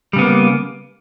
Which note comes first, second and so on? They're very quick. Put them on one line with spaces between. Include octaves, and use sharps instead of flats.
G3 C#3 B3 A#3